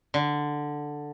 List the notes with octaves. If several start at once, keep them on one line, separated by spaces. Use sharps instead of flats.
D3